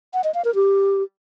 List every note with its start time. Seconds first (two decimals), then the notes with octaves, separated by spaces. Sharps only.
0.14 F#5
0.24 D#5
0.34 F5
0.45 A#4
0.55 G4